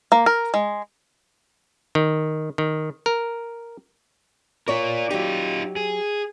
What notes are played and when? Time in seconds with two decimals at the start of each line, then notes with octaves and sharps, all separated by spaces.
0.12 A#3
0.26 A#4
0.54 G#3
1.95 D#3
2.58 D#3
3.06 A#4
4.68 F4 A#4 C#5 D5
5.11 F#3 D#4 F4 G4
5.76 G#4